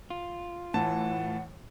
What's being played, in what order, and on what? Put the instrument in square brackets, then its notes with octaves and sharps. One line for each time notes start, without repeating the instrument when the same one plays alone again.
[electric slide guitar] F4
[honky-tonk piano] A2 [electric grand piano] E3 A5 [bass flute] F#5